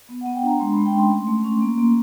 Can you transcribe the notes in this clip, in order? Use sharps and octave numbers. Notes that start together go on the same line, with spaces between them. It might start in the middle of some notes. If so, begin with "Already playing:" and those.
B3
B3 F#5
G5
D4 A#5
G#3 C6
G#3 B5
G5
C#4 C6
A3 C6
A3
C#4
A#3
A#3